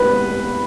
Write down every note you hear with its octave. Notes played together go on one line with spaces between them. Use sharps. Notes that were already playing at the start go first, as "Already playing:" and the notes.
Already playing: B4